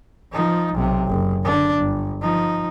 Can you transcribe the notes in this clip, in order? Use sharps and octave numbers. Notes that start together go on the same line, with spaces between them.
F3 D#4
B1 C3
F#1
D3 D4
G1
F3 D#4